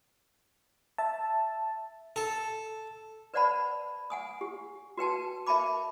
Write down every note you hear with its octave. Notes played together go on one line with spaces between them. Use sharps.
E5 A5
A4
B4 C5 D5 F#5 A5 B5
F#5 G#5 D#6
G4
F#4 B4 G5 A5
A#4 E5 G5 A5 B5 D6